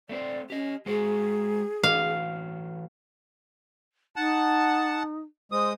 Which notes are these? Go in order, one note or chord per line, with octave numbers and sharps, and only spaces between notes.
A3 C4 C5 D5
C#4 G4 D#5
G#3 F#4 G#4 C5
E3 A3 F#4 F5
D#4 F#5 A5
G#3 C5 D#6